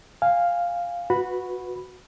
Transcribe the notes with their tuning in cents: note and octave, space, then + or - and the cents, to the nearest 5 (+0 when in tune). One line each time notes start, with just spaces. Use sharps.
F5 +0 G#5 -20
F#4 -15 B4 +0 B5 +0